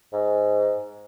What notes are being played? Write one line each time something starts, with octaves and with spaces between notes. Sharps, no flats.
G#2